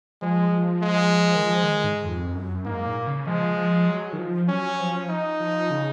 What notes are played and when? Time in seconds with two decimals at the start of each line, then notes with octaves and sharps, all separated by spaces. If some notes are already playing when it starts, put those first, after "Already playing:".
0.22 F3 G#3
0.52 F3
0.82 G#3
1.36 D#3
1.44 F3
1.64 D#3
1.84 G#2
2.05 F2
2.35 F#2
2.65 G#2 A#3
2.86 A#2
3.07 C#3
3.27 F3 G#3
3.57 F3
3.88 F#3
4.13 D#3
4.18 F3
4.49 F#3 C#4
4.80 F3
5.09 D#4
5.40 F3
5.71 C#3